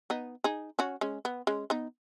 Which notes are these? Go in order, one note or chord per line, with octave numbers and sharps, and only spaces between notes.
B3 D#4
D#4 G#4
C#4 F#4
G#3 C#4
B3
G#3 C#4
B3 D#4